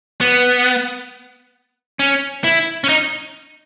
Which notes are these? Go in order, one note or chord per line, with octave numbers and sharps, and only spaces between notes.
B3
C#4
E4
C#4
D#4